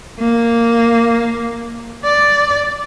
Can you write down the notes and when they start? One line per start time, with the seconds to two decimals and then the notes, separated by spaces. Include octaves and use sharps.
0.20 A#3
2.05 D5